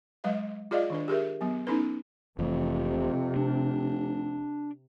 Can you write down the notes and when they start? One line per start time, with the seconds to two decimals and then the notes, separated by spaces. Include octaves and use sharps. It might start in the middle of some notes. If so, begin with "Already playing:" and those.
0.24 F#3 G#3 B4 D#5 F5
0.71 F4 G#4 D5 D#5 F5
0.90 D#3 D4 B4
1.08 G4 G#4 A#4 E5
1.41 F#3 B3
1.67 B3 C#4 D#4 E4 A4 B4
2.39 F1 F2 C3 E3 A3
3.36 F1 D4